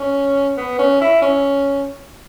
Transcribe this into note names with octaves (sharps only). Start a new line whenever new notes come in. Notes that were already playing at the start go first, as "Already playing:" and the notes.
Already playing: C#4
B3
C#4
E4
C#4